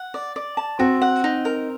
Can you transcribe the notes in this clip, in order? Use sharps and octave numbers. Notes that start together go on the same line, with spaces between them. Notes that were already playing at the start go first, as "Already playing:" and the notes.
Already playing: F#5
D5
D5
A5
C4 F#4
F#5
D#4
A#4